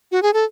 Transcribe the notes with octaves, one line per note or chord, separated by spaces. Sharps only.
F#4
G#4
A4